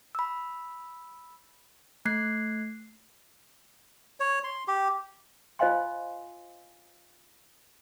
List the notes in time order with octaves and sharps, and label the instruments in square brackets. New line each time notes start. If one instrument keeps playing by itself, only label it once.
[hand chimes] B5 E6
A3 F#6 G#6 C7
[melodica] C#5
C6
G4
[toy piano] F4 C5 D#5 F5 G#5 C6